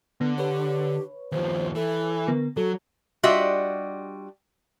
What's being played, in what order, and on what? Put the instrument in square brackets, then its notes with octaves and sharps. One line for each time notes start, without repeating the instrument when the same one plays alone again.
[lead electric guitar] D3 [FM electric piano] B3
[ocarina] G4 [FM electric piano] B4 C#5
[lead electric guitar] D#2 F3 [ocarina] C5
[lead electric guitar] E3 [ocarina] A4
[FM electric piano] D3 B3 A#4
[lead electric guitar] F#3 [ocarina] F#4 [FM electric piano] A4
[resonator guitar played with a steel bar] G3 D4 F4 F#4 D#5 E5